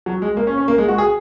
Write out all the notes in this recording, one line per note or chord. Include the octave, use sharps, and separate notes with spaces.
F#3
G#3
A#3
C#4
C#4
A#3
G#3
F#4
G#4